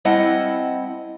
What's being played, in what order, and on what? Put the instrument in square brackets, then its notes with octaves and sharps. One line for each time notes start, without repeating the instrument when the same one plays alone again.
[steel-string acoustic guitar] G3 C4 E4 D#5 F#5 A5